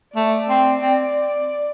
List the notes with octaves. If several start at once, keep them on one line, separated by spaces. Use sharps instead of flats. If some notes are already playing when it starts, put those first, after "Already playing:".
A3 D5
C4
C4